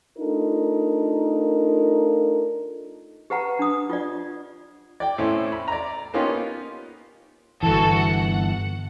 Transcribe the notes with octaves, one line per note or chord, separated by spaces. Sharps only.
A3 D4 D#4 F4 A4 A#4
G4 B4 F#5 A#5
D4 D#6
F4 D5
D5 G5
A2 C4 C#4 E4
B5
D5 A#5
A#3 B3 C#4 D#4 F4 G4
G1 E3 F#4 A4
F#5